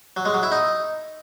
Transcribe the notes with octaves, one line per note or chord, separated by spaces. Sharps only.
F#3
G#3
F#3
E4
D#4